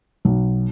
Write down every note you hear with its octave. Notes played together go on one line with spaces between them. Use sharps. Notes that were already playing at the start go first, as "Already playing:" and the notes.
B1